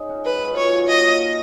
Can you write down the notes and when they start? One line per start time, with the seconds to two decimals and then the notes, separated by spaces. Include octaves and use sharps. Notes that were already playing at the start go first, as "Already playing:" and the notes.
Already playing: C#3 D#4
0.09 F#3 C#4 F#4
0.24 G#2 B4
0.40 F#3 C#4 F4
0.56 A#2 C#5
0.72 F#3 A#3
0.87 F3 D#5
1.03 A#3 D#4